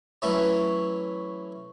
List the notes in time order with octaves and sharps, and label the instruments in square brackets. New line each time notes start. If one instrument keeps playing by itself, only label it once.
[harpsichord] E3 F#3 A3 C#4 E4